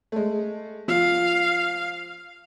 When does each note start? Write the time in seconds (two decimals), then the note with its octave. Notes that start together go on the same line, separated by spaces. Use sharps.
0.12 G#3 A3
0.88 F3 F5